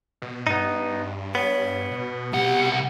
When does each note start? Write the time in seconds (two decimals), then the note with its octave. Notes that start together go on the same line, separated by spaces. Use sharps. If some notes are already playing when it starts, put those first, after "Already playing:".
0.22 B2
0.47 G2 B3 D#4
1.35 B3 C#5
1.91 B2
2.33 C2 G4 F#5